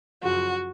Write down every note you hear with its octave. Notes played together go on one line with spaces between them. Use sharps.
F#2 C#3 F3 F#4